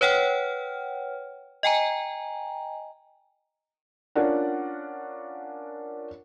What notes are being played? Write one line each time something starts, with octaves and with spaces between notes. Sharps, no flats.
B4 C#5 F#5 G5 F6
D#5 G5 G#5 A#5
C#4 D4 F4 A#4 D5 F#5